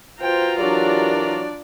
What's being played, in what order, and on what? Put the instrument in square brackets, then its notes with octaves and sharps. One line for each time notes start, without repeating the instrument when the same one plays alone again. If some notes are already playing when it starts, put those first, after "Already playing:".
[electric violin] F4 A#5 [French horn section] F#4 B4 C5 [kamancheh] G5
[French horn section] E3 G4 A#4 [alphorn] F#3 [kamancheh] D4 D5
[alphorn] F#3